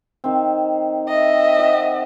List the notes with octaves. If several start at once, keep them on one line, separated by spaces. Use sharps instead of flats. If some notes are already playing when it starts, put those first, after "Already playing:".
D#3 C4
D#5 E5
C4 F#4 G5